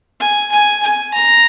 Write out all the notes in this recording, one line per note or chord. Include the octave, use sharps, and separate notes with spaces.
G#5
G#5
G#5
A#5